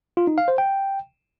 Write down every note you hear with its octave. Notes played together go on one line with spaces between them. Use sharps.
F4
D#4
F5
C5
G5